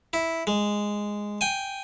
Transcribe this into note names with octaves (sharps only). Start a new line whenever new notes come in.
E4
G#3
G5 G#5